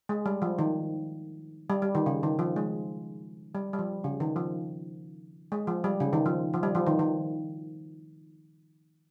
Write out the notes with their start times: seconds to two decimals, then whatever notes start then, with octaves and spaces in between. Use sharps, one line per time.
0.09 G#3
0.26 G3
0.42 F3
0.59 D#3
1.70 G3
1.82 G3
1.95 D#3
2.06 C#3
2.23 D#3
2.39 F3
2.56 G#3
3.55 G3
3.73 G3
3.79 F3
4.04 C#3
4.20 D#3
4.36 F3
5.52 G#3
5.67 F3
5.84 G3
6.00 C#3
6.13 D#3
6.26 F3
6.54 F3
6.63 G3
6.75 F3
6.87 D#3
6.99 D#3